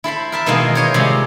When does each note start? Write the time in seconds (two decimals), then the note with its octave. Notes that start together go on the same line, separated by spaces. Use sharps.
0.04 E4 A4 C5 B5
0.32 A#4 E5 A5
0.46 B2 D#3 E3 G#3 A#3 C4
0.75 C5 C#5 D#5
0.94 C3 F3 G3 G#3